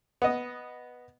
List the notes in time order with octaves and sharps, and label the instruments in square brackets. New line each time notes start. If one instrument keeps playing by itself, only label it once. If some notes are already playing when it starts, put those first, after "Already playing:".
[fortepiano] B3 D#5